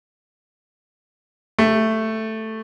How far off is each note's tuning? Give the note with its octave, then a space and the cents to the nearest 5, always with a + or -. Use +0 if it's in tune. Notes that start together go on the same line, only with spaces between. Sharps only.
A3 +5 G4 +25